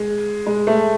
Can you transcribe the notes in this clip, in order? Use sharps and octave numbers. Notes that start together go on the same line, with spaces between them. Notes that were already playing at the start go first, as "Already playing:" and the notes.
Already playing: G#3
G#3
A3